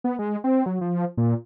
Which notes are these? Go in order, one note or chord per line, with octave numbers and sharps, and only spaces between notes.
B3
G#3
C4
F#3
F3
A#2